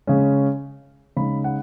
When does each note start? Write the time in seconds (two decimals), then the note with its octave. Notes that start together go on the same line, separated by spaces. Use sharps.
0.07 C#3 G#3 C#4
1.17 C#3 G#3 D#4 B5
1.44 F#5